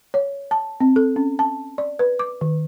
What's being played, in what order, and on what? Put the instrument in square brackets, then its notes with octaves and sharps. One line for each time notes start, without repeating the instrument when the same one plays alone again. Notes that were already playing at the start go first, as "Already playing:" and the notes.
[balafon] C#5
A5
C4
A4
C#4
A5
D5
B4
D6
D#3